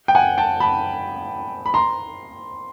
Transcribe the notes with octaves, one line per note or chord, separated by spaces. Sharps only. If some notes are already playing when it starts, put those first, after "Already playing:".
G5
F#5 G#5
G5 A5
A5 B5
B5
A#5 C6